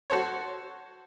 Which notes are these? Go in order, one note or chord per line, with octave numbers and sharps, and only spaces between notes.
F#4 A4 C5 C#5